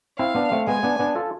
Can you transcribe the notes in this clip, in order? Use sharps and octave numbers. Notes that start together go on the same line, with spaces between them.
C4 E4 F5
B3 D4
A3 C4
G#3 B3 G#5
B3 D4
B3 D4
F4 A4